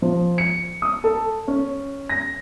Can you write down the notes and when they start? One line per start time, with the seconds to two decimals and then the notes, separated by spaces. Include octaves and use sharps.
0.02 F3
0.38 C#7
0.82 D#6
1.04 A4
1.47 C#4
2.09 A#6